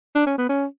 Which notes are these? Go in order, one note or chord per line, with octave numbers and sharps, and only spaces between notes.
D4
C#4
B3
C#4